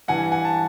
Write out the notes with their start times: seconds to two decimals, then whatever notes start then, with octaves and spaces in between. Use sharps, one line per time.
0.08 G2 E3 F#5 G#5
0.32 F#5 G#5
0.45 A5